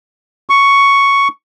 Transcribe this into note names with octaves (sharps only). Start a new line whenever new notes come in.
C#6